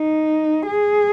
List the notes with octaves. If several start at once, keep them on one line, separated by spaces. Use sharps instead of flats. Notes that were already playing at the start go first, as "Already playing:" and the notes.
Already playing: D#4
G#4